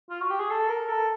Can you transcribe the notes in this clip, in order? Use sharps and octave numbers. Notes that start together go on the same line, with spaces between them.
F4
F#4
G4
G#4
A4
A#4
A4